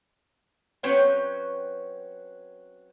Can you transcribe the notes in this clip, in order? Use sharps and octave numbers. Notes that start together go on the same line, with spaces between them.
F#3 C4 C#4 B4 C#5 G5